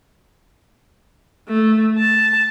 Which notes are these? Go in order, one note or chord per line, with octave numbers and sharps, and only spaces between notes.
A3
A5